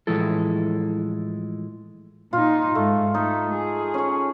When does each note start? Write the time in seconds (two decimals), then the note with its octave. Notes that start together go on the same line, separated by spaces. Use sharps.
0.07 A2 E3 F3 G#3 E4 A4
2.33 A#2 D#4 F4
2.75 G#2 A3
3.14 A3 D#4
3.54 G#4
3.94 C#4 C#5